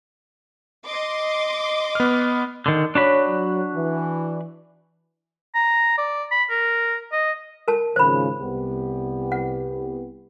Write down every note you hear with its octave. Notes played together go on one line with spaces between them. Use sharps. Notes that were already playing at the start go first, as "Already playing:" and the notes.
D#5 C6 D6
B3 F6
D3 D#3
D4 F#4 C#5 B5
F#3
E3
A#5
D5
B5
A#4
D#5
A#4 A5
G#1 C#3 F3 C5 B5
C2 B3 G4
F#5